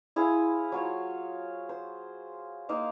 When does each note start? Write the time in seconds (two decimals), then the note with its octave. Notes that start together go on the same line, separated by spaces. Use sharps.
0.16 E4 G#4 C5 F5
0.72 F#3 F4 C#5
1.69 C5
2.69 A#3 D#4 C5 F5